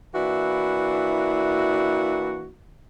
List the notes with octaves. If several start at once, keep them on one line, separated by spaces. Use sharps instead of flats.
E3 A#3 D4 E4 F#4